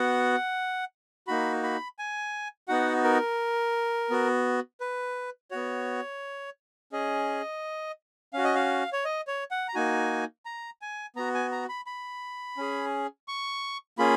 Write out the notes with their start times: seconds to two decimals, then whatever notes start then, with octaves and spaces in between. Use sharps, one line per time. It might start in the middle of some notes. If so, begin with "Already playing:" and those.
Already playing: B3 F#4 F#5
1.27 A#3 D#4 F#4 B5
1.63 B5
1.99 G#5
2.68 B3 D#4 F#4 F#5
3.04 A#4
4.10 B3 F#4
4.80 B4
5.51 B3 F#4 C#5
6.92 C#4 G#4 D#5
8.33 C#4 F#4 F5
8.44 D#5
8.55 F5
8.93 C#5
9.05 D#5
9.27 C#5
9.51 F#5
9.68 A#5
9.74 A#3 D#4 F#4 G#5
10.45 A#5
10.82 G#5
11.16 B3 F#4 A#5
11.35 G#5
11.52 A#5
11.69 B5
11.86 B5
12.57 C#4 G#4
13.28 C#6
13.98 A#3 C#4 F4 G#4 B5